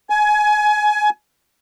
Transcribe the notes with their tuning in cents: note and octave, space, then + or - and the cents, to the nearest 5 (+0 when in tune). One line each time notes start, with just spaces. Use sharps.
G#5 +25